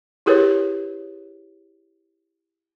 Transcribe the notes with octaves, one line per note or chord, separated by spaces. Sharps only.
E4 G4 G#4 A#4 B4 C#5